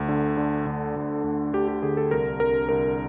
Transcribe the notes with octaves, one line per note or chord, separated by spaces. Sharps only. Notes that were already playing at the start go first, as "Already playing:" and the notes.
Already playing: D2
D3
D3
D2
D2
D2
D2 G4
G4
D3 G#4
A4
C2 A#4
C2 A#4
C2 A#4